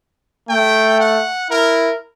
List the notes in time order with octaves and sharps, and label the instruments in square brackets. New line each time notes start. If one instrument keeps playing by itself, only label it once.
[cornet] A3 [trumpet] G5
[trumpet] F#5
[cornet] E4 [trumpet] A#4